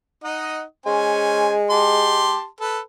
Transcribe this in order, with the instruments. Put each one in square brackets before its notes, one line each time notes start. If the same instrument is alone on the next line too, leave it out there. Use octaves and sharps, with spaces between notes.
[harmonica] D#4 D#5 F#5
[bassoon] G#3 [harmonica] C#4 C5 G#5
[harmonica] G4 A5 C6
A4 B4